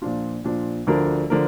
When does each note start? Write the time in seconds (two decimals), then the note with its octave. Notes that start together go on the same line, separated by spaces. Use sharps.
0.02 A#2 F3 D4 F4
0.44 A#2 F3 D4 F4
0.87 D2 D3 F3 D4 A#4
1.30 D3 F3 D4 A#4